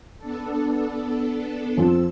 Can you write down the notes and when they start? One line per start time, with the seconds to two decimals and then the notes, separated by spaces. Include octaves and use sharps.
0.18 B3 D4 A4
1.77 F2 F3 C4 E6